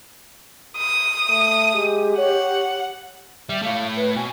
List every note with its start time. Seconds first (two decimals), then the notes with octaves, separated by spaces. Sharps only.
0.77 D#6
1.29 A3
1.75 G#3 G4
2.18 C#5 F#5
3.49 G3 E5
3.63 A3 C#5 F5
3.96 B4
4.15 B2 G#5